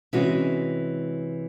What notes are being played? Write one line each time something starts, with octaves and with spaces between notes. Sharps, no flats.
C3 E3 G#3 C#4 F#4